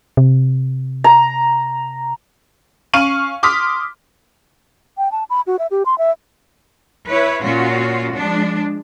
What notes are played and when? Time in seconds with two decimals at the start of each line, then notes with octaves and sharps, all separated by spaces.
0.17 C3
1.04 A#5
2.93 C#4 F5 C#6 D#7 F#7
3.43 C6 D6 D#6 F6 B6
4.98 G5
5.12 A5
5.30 B5
5.47 F#4
5.59 E5
5.71 G4
5.85 C6
5.98 E5
7.09 E4 B4 C#5
7.43 A#2 C#4 F4 F#4
8.15 F3 G#3 D4